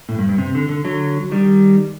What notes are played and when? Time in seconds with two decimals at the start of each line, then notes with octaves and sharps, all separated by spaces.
0.09 A2
0.19 G2
0.29 G2
0.38 C3
0.55 D3
0.69 D3
0.85 D3 F#3
1.32 D#3 G3